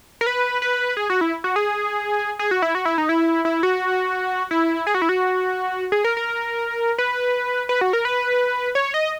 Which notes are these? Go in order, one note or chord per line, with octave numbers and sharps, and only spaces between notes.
A#4
B4
B4
G#4
F#4
E4
F#4
G#4
G#4
F#4
E4
F#4
E4
D#4
E4
E4
F#4
E4
G#4
F#4
E4
F#4
G#4
A#4
A#4
B4
B4
F#4
A#4
B4
C#5
D#5